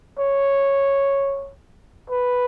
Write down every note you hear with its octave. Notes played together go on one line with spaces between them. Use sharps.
C#5
B4